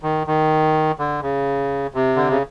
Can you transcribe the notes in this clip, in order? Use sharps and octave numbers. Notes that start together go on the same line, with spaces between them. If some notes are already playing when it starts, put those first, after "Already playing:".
D#3
D#3
D3
C#3
C3
D3
C#3